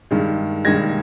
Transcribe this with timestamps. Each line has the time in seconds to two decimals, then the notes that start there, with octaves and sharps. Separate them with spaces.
0.11 G2 D#3 G#3
0.65 G2 D#3 G#3 G#6 A#6